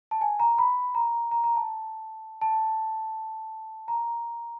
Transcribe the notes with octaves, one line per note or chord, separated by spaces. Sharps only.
A5
G#5
A#5
B5
A#5
A#5
A#5
A5
A5
A#5